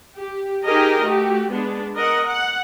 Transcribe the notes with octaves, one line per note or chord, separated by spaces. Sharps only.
G4
D#4 G4 G#4 A#4 D#5
A3 F#4 G4
G#3 B3 D4
A#4 D#5 F#5
F#5